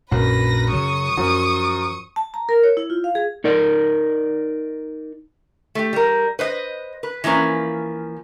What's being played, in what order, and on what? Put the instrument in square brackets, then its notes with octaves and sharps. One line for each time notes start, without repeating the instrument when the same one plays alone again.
[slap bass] A#1 [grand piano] F#2 [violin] B4 A#6
[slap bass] C#3 F#3 [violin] C#6 D#6
[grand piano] F#2 [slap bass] F3
[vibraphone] A5
A#5
A#4
C#5
E4
F4
F5
G#4
[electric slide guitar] D#4 A#4 D5
[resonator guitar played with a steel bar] A3 G4
G3 A#4
B4 C5 D#5
B4
E3 F3 A#3 C#4 B4